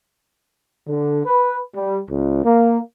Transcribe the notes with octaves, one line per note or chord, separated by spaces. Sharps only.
D3
B4
G3
C#2
A#3